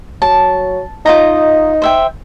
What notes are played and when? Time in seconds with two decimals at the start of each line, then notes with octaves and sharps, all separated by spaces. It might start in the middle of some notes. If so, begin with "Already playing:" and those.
0.22 F#3 A5
1.06 D#4 F4 D#5 A#5
1.82 C5 E5 G5